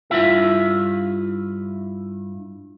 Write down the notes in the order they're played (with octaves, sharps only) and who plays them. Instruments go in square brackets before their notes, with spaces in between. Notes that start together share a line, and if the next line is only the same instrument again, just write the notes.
[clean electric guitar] G2 E4 F4 E5